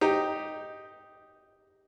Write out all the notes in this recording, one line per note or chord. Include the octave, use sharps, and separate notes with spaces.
D#4 G4